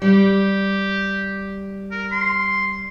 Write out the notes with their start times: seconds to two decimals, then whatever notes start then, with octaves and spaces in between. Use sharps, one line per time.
0.02 G3 G4
1.91 A#4
2.12 C6